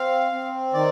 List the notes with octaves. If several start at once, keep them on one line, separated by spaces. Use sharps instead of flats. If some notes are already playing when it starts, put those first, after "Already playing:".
Already playing: C4 F5
C4
D#3 D5